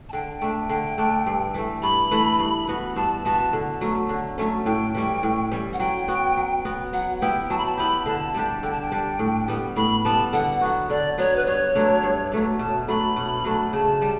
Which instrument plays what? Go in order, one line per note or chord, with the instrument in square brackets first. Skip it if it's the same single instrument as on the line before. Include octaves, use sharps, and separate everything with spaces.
[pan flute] A5
[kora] D3 [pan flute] G5
[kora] A3 D4
[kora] D3 [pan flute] G5
[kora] A3 D4
G2
E3 A3
[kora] G2 [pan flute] B5
[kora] E3 A3
G2
E3 B3 F#4
[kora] G2 [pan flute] A5
[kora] E3 B3 F#4 [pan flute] A5
[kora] D3
F#3 A3 C#4
D3
F#3 A3 C#4
[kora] A2 [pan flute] G5
[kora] E3 G3 C#4
A2
E3 G3 C#4
[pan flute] F#5
[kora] F#3 [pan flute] G5
[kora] B3 F#4
F#3
B3 F#4
[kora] F#3 [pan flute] F#5
[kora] B3 E4 G4 [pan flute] G5
[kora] F#3 [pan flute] A5
[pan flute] B5
A5
[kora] B3 E4 G4 [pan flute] B5
[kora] D3 [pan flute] A5
[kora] G3 D4 G4
[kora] D3 [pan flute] G5
[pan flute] A5
G5
[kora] G3 D4 G4
A2
G3 B3
[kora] A2 [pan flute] B5
[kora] G3 B3 [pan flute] A5
[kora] D3 [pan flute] F#5
[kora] F#3 B3 F#4
[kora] D3 [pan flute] D5
[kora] F#3 B3 F#4 [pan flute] C#5
[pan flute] B4
[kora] G2 [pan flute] C#5
[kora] F#3 A3 D4
G2
F#3 A3 D4
[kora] B2 [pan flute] A5
[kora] F#3 A3 D4 [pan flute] B5
[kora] B2
F#3 A3 D4
[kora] C#3 [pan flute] A5
[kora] G3